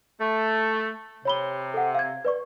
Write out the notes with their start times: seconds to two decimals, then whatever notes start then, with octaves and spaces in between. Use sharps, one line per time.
0.21 A3
1.25 C3 C#5 B5 G7
1.74 A4 F#5
1.95 F5 G#6
2.25 B4 D5 C#6